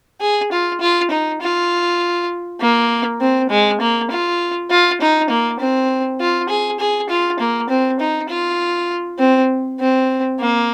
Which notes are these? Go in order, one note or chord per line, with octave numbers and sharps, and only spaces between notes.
G#4
F4
F4
D#4
F4
A#3
C4
G#3
A#3
F4
F4
D#4
A#3
C4
F4
G#4
G#4
F4
A#3
C4
D#4
F4
C4
C4
A#3